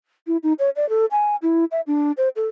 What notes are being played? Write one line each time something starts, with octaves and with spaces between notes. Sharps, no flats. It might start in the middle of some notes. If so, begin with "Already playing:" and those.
E4
D#4
C#5
D5
A4
G#5
E4
E5
D4
C5
A4